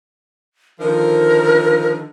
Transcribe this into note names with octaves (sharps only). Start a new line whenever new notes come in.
D3 D#3 F3 A#4